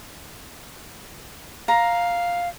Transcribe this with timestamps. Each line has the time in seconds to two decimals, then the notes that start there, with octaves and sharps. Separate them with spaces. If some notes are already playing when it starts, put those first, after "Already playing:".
1.68 F5 A#5